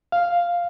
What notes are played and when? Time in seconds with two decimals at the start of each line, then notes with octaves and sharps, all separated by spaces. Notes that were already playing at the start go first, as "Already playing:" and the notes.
0.12 F5